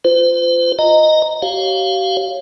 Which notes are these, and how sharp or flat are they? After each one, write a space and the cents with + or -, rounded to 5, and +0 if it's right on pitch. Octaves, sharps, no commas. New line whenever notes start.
F4 -5 C5 -35
D#5 +0 A#5 -10
G4 -45 C#5 -10 F5 +0